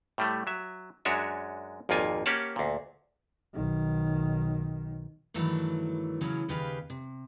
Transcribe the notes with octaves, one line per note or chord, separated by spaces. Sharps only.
A2 G3 A3
F#3 E5
F#2 G#3 D4 F#4 C#5 E5
G#1 F2 A#2 A#3 F4 G#5
A#3 C#4 G4 C#5 F#5 A5
D2 A#2
B1 D#3
G2 D#3 E3 F#3 A3
A2 C#3 E3 F#3 C#4
D#2 C#3 G4 B4 F5
C3